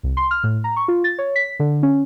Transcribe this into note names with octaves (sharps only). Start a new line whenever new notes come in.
C2
C6
F6
A2
A#5
C#6
F4
A6
C#5
B6
D3
C#4